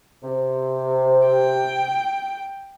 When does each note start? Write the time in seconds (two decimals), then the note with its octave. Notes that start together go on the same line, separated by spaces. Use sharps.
0.23 C3
1.26 G5